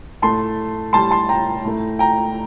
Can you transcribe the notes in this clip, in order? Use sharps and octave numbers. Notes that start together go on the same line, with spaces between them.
A2 A3 A5 C6
A2 G3 A5 C6
A5 C6
G5 A#5
A2 A3
G5 A#5